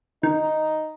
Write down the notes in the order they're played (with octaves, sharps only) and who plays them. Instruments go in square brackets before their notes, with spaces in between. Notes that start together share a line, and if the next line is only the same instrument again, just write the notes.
[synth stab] D#3 [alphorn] D#4